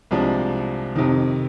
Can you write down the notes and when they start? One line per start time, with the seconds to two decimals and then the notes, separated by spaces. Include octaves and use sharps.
0.11 C2 C3 F3 G#3 D4
0.96 F2 C3 D#3